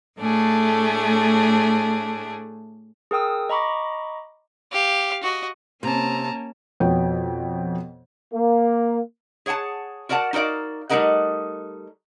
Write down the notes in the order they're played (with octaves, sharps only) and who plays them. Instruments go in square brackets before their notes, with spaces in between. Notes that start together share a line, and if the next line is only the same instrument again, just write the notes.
[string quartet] A2 A3 D4 G#4
[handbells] G#4 A#4 G5 D#6 E6
D#5 A#5 B5 C#6 D6
[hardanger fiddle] G4 F5
F#4 D#5
[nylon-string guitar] C3 [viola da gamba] A#3 C#4 [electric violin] A5 A#5
[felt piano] F2 B2 B3 C#5 G5
[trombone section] A#3
[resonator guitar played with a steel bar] G#4 C#5 F#5 G#5 A5
F#4 A#4 D5 F#5 A5
D#4 F#4 A#4 D5 F5
G3 A3 D#4 A#4 D#5 F#5